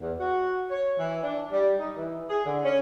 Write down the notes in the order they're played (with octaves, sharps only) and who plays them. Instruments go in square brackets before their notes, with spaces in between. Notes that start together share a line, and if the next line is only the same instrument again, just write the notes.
[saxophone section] E2
F#4
C#5
E3
D4
G3
D#4
E3
G#4
D3
C#4